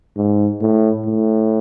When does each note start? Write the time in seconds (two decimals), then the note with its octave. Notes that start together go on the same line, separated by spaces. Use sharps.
0.17 G#2
0.61 A2
1.06 A2